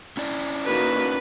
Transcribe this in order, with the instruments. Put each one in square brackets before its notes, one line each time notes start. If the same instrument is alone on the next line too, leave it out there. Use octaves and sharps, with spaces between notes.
[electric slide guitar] C#4 E4 D5
[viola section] D#3 A#3 F#4 [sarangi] B4